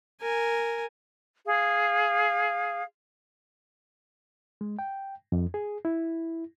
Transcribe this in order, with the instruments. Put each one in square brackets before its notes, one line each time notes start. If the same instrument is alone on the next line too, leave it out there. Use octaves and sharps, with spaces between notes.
[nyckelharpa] A#4 G#5
[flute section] G#4 F5
[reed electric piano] G#3
G5
F2
G#4
E4